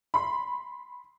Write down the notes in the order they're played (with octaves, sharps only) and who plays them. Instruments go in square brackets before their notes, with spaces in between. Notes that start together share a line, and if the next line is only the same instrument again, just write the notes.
[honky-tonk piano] B5 C6